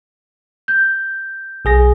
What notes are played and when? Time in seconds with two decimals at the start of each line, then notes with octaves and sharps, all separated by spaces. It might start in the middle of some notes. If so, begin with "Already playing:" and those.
0.68 G6
1.65 B1 G#4 A#6